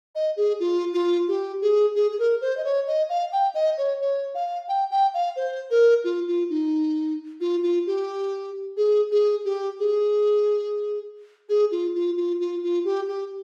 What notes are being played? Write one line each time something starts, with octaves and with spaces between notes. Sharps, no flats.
D#5
G#4
F4
F4
G4
G#4
G#4
G#4
A#4
C5
D#5
C#5
D#5
F5
G5
D#5
C#5
C#5
F5
G5
G5
F5
C5
A#4
F4
F4
D#4
F4
F4
G4
G#4
G#4
G4
G#4
G#4
F4
F4
F4
F4
F4
G4
G4